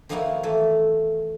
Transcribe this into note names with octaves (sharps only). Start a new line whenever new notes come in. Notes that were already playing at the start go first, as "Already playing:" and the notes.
D#3 F3 A#3 D#4 E4 F#4
E3 A3